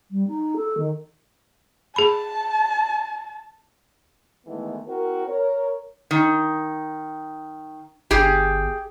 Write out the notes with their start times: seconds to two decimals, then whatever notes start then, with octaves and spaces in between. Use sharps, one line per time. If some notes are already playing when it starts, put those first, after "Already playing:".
0.10 G3
0.27 D#4
0.56 A4
0.77 D#3
1.96 G#4 A5 B5
4.46 D#3 E3 G#3 A3 B3 A4
4.87 C4 E4 F#4 A#4
5.28 A#4 C#5
6.11 D#3
8.11 G1 G4 G#4